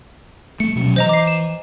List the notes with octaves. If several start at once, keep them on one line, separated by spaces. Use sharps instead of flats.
A3 C#7
B2 F#3 C#4
E3 C5 D#5 A#5
D6 C7
E7